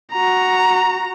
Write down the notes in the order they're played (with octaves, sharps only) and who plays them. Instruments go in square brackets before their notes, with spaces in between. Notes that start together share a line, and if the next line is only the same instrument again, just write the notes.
[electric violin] F#4 A#5